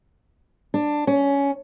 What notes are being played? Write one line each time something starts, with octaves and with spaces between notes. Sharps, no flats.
D4
C#4